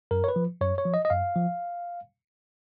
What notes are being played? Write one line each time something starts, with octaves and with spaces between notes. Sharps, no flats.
F#2 A#4
C#5
B4
F3
F#2 C#5
C#5
F3
D#5
D#5
F#2 F5
F3